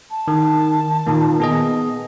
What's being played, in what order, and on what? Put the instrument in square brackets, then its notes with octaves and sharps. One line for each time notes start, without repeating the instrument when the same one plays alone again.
[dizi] A5
[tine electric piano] D#3
A#2 D#3 A#3
B3 G#4 D#5